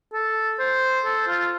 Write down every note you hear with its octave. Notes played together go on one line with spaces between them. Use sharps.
A4
C5
A4
F4